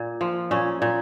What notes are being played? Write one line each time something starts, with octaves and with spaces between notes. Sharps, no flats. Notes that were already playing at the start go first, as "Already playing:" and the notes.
Already playing: A#2
F3
A#2 C#4
A#2